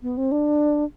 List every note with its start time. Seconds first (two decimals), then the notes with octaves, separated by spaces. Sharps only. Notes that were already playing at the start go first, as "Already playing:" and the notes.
0.03 B3
0.17 C4
0.32 D4